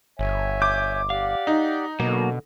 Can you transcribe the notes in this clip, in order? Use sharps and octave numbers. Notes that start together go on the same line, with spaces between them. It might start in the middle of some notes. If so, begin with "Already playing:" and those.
G1 C#5 E5 G#5
D6 G6
G4 D5 F5 F#5
D#4
B2 D3 F#3 A#3